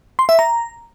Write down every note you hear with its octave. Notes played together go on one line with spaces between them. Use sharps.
C6
E5
A#5